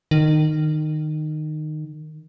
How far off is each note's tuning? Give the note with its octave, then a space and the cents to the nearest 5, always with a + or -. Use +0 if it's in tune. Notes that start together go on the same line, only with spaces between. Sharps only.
D#3 -20